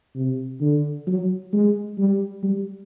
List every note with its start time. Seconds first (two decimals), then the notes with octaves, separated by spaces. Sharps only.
0.15 C3
0.61 D3
1.07 F#3
1.52 G#3
1.98 G3
2.43 G3